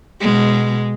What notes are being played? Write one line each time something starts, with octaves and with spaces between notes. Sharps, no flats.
B2 G#3